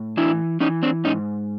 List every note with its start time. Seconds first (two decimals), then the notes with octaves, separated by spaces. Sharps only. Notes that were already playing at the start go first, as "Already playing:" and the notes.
Already playing: A2
0.17 E3 D4 E4
0.60 E3 C#4 D#4
0.83 C4 D4
1.04 G#2 C#4 D#4